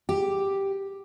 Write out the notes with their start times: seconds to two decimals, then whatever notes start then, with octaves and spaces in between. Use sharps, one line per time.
0.09 G4